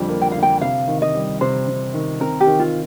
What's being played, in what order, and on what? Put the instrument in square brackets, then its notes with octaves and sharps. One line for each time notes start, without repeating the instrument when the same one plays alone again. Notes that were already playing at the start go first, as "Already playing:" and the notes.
Already playing: [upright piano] F2 D3 G3
A#3
[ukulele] G5
[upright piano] D3 [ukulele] F5
[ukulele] G5
[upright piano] C3 [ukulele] F5
[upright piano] D#3
[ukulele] D#5
[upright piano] G3
[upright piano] C3 [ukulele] C5
[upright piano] C3
D#3
[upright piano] C4 [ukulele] A#4
[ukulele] G4
[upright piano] D#3
[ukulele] F4